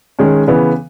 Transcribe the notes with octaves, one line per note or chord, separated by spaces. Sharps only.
D#3 G#3 C#4
C#3 E3 B3